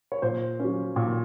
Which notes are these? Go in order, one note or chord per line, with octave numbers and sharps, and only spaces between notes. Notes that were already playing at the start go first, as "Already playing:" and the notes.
C#5
A#2 C5
F#3 C#4
A#2